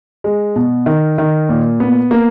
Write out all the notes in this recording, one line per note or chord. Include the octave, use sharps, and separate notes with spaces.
G#3
B2
D#3
D#3
A#2
B3
A#3